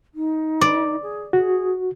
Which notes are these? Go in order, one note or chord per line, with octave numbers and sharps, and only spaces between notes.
D#4
D5
G#4
F#4 G#4